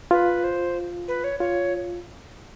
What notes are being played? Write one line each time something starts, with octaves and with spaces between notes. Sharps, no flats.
F4 B4
C5
B4
C#5
F4 C#5